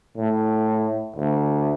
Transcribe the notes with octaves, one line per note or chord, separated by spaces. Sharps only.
A2
D2